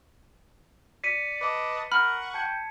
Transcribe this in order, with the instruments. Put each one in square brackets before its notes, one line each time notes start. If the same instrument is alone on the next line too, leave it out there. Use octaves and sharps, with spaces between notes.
[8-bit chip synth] D5 [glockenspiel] B6 C#7 D#7
[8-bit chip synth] B4 D#5 A5 [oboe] D6
[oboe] A#4 [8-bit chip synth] F#5 C#6 F#6 [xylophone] B5 F6
[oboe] G5 [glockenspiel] A5 G#6 C#7